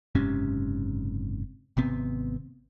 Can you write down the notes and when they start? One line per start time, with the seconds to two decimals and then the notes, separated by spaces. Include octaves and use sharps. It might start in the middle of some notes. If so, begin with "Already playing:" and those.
0.15 F#1 G#2 C3 C#4
1.77 G#1 C3 B3 C4